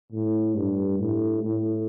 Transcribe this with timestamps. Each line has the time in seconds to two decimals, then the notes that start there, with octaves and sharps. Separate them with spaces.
0.12 A2
0.55 G2
0.98 A2
1.42 A2